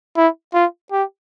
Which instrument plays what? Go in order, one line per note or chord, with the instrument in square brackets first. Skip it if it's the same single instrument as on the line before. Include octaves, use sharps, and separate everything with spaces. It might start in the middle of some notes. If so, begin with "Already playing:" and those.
[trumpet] E4
F4
G4